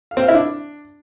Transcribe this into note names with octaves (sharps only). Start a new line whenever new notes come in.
F5
C4
F5
E4
D4